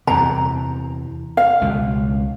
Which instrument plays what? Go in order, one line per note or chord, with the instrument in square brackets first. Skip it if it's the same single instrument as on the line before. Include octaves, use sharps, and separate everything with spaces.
[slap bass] E2 C3 [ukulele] A#5
[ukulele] F5
[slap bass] C#2 B2